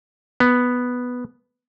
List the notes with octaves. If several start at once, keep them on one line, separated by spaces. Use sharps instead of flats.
B3